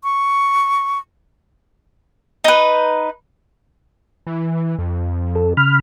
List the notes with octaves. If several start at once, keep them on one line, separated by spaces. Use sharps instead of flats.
C#6
D#4 B4
E3
F2
A4
C#3 B5 F6